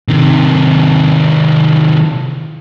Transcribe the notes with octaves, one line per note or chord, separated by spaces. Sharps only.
C3 D#3